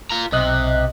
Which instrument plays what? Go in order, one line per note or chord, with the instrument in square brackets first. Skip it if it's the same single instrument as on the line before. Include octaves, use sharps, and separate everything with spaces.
[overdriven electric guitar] F4 A#5
[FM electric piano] B1 D#5 F#6 [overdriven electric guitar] C3